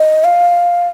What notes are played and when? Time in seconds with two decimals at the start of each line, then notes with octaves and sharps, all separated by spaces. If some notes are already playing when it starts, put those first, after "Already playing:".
Already playing: D#5
0.24 F5